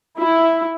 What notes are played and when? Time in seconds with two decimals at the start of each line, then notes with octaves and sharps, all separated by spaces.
0.18 E4